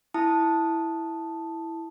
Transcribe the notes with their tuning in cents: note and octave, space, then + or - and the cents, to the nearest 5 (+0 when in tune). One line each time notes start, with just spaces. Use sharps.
E4 +0 A5 +0 D#6 +0